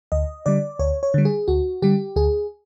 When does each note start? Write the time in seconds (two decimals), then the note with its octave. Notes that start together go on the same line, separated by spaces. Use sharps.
0.12 D2 D#5
0.46 D3 G3 D5
0.79 D2 C#5
1.03 C#5
1.14 D3 G3
1.25 G#4
1.48 D2 F#4
1.82 D3 G3 G4
2.16 D2 G#4